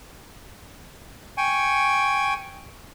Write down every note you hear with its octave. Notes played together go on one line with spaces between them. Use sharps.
G5 G#5 C#6